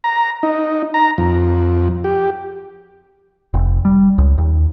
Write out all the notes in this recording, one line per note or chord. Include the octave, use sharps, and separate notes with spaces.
A#5
D#4
A#5
F2
G4
F1
G3
C#2
D#2